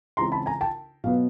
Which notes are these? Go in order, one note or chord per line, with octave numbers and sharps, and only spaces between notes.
C#3 E3 G#3 C4 E4 A#5 C6
A5 B5
G#5 A#5
G5 A5
B2 F#3 B3 F5